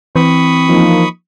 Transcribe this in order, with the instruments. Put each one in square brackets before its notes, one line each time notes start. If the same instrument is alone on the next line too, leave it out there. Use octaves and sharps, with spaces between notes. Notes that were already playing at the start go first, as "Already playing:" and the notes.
[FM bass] E3 [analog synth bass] C4 [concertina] B5 C#6 D#6
[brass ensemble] F3 A#3 D#4